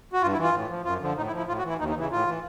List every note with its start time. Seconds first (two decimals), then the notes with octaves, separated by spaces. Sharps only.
0.13 F#4
0.22 G2 F4
0.33 E4
0.38 E3
0.43 F4
0.54 A2
0.69 F3
0.84 F#2 F4
1.01 D3 F3
1.17 A2 D#4
1.27 E4
1.32 F3
1.38 E4
1.48 A2 F4
1.59 F#4
1.64 E3 E4
1.79 D#2 D#4
1.90 D#4
1.95 C#3 E3 E4
2.11 A2 F4
2.27 E3